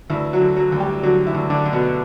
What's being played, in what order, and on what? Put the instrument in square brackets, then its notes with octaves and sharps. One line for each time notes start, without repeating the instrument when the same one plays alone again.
[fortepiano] D2 E3 E4
F#3 F#4
D3
F#3 F#4
D2
G3 G4
D3 F#3 F#4
E3 E4
D2
D3 D4
D3
B2 B3